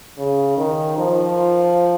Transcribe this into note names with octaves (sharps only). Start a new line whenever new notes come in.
C#3
D#3
F3